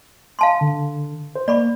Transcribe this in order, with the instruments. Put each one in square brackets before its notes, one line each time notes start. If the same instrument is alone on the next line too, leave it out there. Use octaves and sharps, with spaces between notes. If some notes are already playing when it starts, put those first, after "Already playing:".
[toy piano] F5 A5 C6
[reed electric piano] D3
C5
[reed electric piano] A#3 [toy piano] D5 B5 C#6